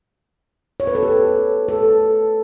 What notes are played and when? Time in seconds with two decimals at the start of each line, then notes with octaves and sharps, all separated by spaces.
0.80 C#5
0.87 B4
0.95 A4
1.03 G4
1.68 A4